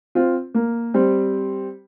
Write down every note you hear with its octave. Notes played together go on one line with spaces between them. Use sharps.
C4 F4
A#3
G3 C4